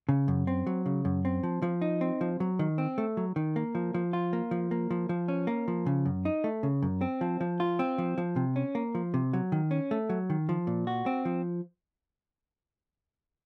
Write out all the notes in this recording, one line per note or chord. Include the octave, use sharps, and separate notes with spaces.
C#3
F#2
C4
F#3
C#3
F#2
C4
F3
F3
D#4
C4
F3
F#3
D#3
C4
A3
F#3
D#3
A#3
F3
F3
F4
A#3
F3
A#3
F3
F3
C#4
A#3
F3
C#3
F#2
D#4
A3
C#3
F#2
C4
F3
F3
F4
C4
F3
F3
C3
C#4
A#3
F3
C3
F#3
D#3
C#4
A3
F#3
D#3
F3
A#2
F#4
C4
F3